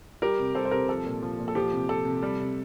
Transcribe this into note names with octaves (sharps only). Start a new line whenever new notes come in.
G3 G4 A#4
C3
G3 A4 C5
C5
C3 G4 A#4
F3 A4
A#2
F3
A#2
A4
F3 G4
C3
F3 A4
C3
G3
C3